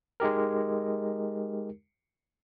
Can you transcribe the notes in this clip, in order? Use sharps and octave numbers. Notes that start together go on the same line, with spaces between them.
G#3 D#4 G4 A#4